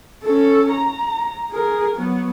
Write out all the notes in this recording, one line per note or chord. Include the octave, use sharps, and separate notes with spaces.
C#4 A4
A#5
G#4 A#4
F#3 B3